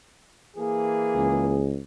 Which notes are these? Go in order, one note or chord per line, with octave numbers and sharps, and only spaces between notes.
E3 A#3 G#4
C#2